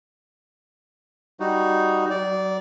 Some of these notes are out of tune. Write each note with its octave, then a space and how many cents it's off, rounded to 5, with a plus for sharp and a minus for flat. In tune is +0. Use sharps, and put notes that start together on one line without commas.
G3 +0 D#4 +0 F#4 +0
F#3 +30 D5 -15